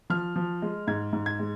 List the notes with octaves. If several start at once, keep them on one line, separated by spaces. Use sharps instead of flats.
F3 F6
F3
G#3
G#2 G#6
G#2
G#6
G#3